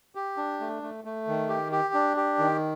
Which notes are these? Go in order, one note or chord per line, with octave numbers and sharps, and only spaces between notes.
G4
D4
A3
A3
A3
D#3
G4
G4
D4
G4
D#3